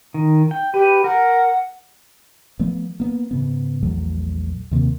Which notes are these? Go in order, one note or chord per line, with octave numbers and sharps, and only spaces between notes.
D#3
G5
G4 B4
A#4 F#5
F3 A3 B3
A#3 B3
G#2 C#3 B3
A#1 E2 F#3 A3
D#2 C3 A#3